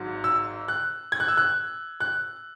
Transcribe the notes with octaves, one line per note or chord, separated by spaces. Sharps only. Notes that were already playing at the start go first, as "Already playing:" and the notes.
Already playing: G#1 G#2 F#3
E6
F#6
G#6
F#6
E6
F#6
F#6